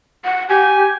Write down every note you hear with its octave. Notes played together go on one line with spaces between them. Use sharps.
F#5
G4 G#5